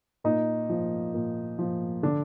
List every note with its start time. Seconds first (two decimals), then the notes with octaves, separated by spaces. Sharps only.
0.24 A#2 D#4
0.70 F3
1.14 A#2
1.59 F3
2.03 D3 D4